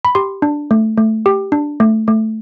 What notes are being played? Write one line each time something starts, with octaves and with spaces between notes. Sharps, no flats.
B5
G4 C6
D4
A3
A3
G4
D4
A3
A3